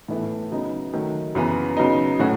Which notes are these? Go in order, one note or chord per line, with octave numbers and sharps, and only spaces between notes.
A2 E3 B3 E4 A4
C#3 F#3 B3 D#4
D#3 F#3 A3
F#2 C#3 E3 B3
C#3 F#3 B3 D#4
A2 F#3 A3 C#4 F#4